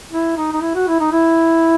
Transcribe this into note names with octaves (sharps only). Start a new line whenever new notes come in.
E4
D#4
D#4
E4
F#4
E4
D#4
E4